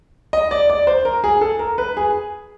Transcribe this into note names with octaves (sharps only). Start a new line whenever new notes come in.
D#5
D5
D5
C5
A#4
G#4
A4
A#4
B4
G#4